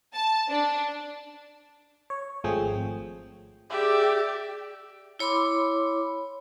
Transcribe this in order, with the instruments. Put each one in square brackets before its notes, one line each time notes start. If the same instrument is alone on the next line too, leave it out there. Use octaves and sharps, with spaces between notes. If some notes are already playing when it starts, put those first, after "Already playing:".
[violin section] A5
D4
[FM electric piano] C#5
G#1 F3 A3 C4 G#4 G5
[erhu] G4 [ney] G#4 [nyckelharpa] D5 E5
[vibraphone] E4 C#5 B5 C6 D6